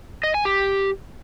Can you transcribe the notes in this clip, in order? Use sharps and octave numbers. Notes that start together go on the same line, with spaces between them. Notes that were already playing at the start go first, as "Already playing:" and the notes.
D#5
G#5
G4